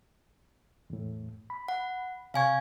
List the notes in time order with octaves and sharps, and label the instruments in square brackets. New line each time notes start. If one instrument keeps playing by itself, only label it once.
[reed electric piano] E2 A2
B5
[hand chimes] F#5
[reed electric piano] C3 C#5 C#6 [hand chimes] F5 G#5 G#6